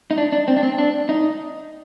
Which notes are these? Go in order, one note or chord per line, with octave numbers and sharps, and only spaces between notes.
D#4
D4
D4
C4
D4
C4
D4
D#4